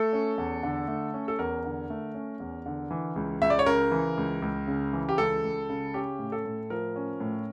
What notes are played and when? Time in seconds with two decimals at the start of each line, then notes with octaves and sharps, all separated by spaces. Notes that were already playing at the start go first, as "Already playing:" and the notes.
Already playing: A3 A4
0.13 C#4
0.38 E2
0.63 D3
0.88 A3
1.14 C#4
1.28 A4
1.39 E2 A#4
1.64 D3
1.90 A3
2.15 C#4
2.40 E2
2.66 D3
2.91 E3
3.16 C#2
3.41 C#2 E5
3.50 D5
3.59 C#5
3.66 C#3 A#4
3.91 E3
4.17 C#2
4.42 C#2
4.68 C#3
4.93 E3
5.09 G4
5.18 C#2 A4
5.44 C#2
5.70 C#3
5.94 C#4 G4
6.19 A2
6.32 A4
6.45 A2
6.70 F3 A#4
6.96 C#4
7.20 A2